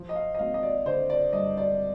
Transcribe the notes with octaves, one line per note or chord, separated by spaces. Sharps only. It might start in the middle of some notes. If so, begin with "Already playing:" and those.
Already playing: F3
D#5
F5
D#5
G#1 F5
D#5
D5
D3 C5
D5
G2 D#5
D5